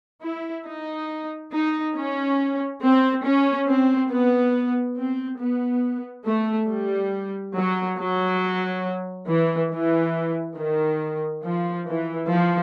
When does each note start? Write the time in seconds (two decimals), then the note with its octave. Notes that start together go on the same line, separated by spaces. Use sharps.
0.22 E4
0.65 D#4
1.51 D#4
1.95 C#4
2.82 C4
3.24 C#4
3.68 C4
4.10 B3
4.97 C4
5.39 B3
6.26 A3
6.69 G3
7.56 F#3
7.99 F#3
9.29 E3
9.71 E3
10.58 D#3
11.45 F3
11.87 E3
12.30 F3